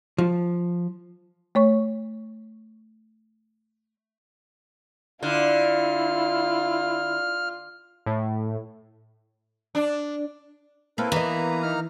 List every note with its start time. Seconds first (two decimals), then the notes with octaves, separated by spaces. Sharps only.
0.18 F3
1.55 A3 C#5 C#6
5.23 D3 E4 F4 F6
8.06 A2
9.75 D4
10.98 A#3 C4 E4 A4 B4
11.12 E3 A#3 B3 D#5 A#5
11.63 D#4 F6